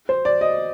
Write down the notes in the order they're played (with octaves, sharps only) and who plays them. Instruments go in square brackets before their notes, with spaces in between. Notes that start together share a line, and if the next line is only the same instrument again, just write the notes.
[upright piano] C5
D5
D#5